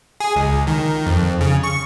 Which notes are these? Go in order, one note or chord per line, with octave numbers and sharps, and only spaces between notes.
G#4
C#2
D#3
F2
C#3
C#6